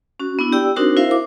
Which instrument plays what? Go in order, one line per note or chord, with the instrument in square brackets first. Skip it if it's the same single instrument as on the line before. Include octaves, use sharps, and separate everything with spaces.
[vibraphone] C#4 F#4
B3 D4 E4
G4 D5 G5 E6
C4 D4 D#4 F#4 A#4 C5
E4 A#4 C5 E5 F5
D6